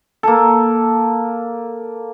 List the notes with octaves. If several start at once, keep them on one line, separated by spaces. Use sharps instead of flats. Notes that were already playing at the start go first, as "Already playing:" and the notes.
A#3 A4